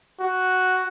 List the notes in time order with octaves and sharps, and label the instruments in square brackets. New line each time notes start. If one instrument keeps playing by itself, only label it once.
[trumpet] F#4